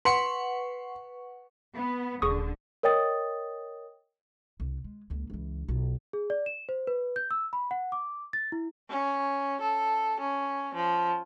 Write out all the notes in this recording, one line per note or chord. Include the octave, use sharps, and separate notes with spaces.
B4 F#5 C6 C#6 C#7
B3
D#1 D3 G#4 C#6 D#6
A#4 C#5 D#5 G5 D#6 A6
C2
G#3
C#2 A#3
C#2 E3
B1 F4
G#4
D5
E7
C5
B4
G6
E6
B5
F#5
D6
A6
E4
C#4
A4
C#4
F3